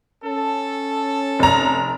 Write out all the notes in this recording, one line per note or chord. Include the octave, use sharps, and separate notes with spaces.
C#4 A4
F1 A#5